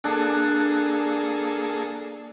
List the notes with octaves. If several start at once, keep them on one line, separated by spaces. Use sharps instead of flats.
A#3 D4 G#4 A4